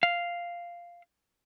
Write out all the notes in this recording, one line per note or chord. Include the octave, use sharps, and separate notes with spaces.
F5